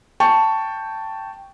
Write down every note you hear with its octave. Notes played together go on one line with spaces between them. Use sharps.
G5 A5 C#6